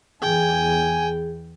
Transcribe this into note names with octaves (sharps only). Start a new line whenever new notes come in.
E2 E3 G#4 G5 G#5